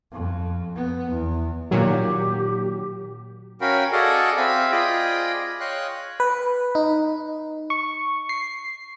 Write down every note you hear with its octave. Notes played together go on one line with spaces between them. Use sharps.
F2
B3
E2
A#2 D#3 F#3 G4
C#4 F#4 A#4 F5 G5 B5
F#4 G#4 A4 D5 D#5 F5
C4 E5 F5 B5
F4 G#4 D5 D#5 G5 B5
C#5 D#5 F5 G5 C6 F#6
B4
D#4
C#6
C7